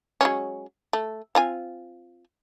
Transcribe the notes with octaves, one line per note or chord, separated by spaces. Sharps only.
F#3 G#3 C#4
A3
C4 F4 G#5